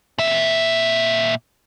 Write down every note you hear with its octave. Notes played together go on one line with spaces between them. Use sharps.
A#2 E5